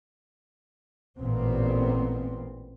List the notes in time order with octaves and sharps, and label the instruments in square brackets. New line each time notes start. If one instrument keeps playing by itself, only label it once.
[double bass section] A1 A#2 B3 C4